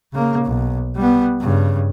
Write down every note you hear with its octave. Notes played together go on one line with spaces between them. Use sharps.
C#3 A#3
B1
G3 B3
G2 C#3